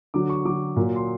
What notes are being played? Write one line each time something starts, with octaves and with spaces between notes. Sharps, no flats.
D3 F#3 D6
C#6
D3 F#3 D6
A#2 F#3
C6